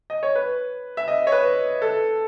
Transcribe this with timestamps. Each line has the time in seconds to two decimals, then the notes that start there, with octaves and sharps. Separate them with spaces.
0.10 D#5
0.23 C#5
0.35 B4
0.97 E5
1.08 D#5
1.27 C#5
1.32 B4
1.82 A4